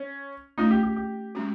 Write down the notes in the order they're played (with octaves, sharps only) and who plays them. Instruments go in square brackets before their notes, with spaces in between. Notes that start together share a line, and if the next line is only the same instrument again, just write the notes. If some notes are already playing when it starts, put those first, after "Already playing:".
Already playing: [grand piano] C#4
[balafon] A3 C#4 F4 [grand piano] D#4
[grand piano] G4
G4
G4
[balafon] G#3 C#4 F#4